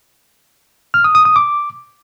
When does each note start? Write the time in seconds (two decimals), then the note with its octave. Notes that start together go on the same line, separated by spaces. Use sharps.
0.94 F6
1.04 D#6
1.15 D#6
1.25 D#6
1.36 D6